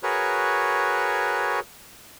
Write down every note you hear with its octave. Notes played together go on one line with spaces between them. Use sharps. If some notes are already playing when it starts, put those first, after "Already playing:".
F#4 G#4 A#4 B4 C#5